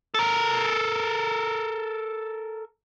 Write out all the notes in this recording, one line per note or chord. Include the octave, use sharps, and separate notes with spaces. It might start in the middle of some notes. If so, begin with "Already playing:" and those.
A4 A#4